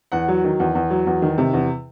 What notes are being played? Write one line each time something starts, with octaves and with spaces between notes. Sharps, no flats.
E2 F#5
F#3
D#3
E2
E2
F#3
E2
D#3
C3
E2